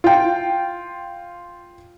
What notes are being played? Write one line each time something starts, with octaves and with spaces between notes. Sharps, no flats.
F4 G5